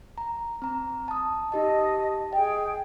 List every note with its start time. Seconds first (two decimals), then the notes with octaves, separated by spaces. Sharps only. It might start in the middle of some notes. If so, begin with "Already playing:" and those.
0.18 A#5
0.62 C4 A#5
1.08 A5 D#6
1.52 D#4 G4 D#5 A5
2.33 G#4 D#5 G5